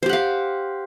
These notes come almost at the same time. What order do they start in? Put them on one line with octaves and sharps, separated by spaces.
C5 G4 F#5 F5